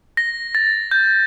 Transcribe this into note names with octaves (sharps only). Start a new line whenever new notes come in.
A#6
A6
G6